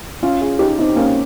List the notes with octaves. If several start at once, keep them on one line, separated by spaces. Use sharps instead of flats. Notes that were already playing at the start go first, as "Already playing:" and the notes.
C#4 F4
F4 G#4
D#4 G4
C4 D#4
A#3 C#4